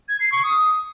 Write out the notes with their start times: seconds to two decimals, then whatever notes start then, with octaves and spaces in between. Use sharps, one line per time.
0.09 G#6
0.20 C7
0.32 C#6
0.44 D#6